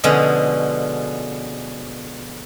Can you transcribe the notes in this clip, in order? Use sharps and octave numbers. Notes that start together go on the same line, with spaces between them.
B2 D3 F3 G#3 C#4